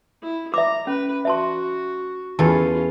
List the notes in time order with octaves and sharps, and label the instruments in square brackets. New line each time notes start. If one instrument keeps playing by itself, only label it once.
[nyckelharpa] E4
[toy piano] E5 D6 [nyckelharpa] A#5
[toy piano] C#4 [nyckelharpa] B4
[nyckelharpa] F#4 [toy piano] E5 A5 C6
[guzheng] E2 A4 [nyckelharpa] C#4 F4 [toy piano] A5